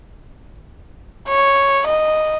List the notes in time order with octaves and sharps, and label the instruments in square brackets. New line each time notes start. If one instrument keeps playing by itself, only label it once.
[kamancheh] C#5
D#5